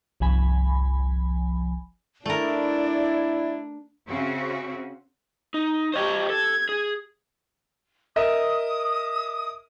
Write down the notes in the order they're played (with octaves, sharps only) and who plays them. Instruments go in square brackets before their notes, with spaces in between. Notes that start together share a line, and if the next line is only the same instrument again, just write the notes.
[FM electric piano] G1 C2 F3 G#5 B5
[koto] A3 A#4 [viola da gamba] D4 [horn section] E4 [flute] D5
[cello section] C#3 C4 C#4 F#4 E5
[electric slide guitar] D#4
[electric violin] G4 C#5 [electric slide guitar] C5 D#5 G5
[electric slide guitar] A4 [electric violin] G#6
[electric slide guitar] G#4
[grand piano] A#4 D#5 E5 [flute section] D#6